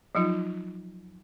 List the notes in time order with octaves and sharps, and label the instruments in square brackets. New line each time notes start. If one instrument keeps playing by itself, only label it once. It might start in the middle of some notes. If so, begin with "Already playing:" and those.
[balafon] F3 F#3 D#4 F4